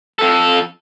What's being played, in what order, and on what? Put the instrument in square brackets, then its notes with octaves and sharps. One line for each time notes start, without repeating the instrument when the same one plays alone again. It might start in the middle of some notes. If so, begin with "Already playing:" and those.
[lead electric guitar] F2 A4